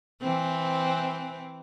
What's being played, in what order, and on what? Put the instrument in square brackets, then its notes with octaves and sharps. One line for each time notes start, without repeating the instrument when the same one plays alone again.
[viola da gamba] E3 C4